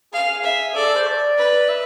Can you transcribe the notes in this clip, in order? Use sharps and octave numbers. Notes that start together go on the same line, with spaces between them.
G#4 F5
E5
A4 D5
A4
C5
D5
B4
E5